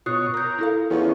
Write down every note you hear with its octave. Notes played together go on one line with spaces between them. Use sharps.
B2 F4 C#5 D#6 F#6 C7
A#4 D#6 G6
E4 A4 F5
E2 F3 C#4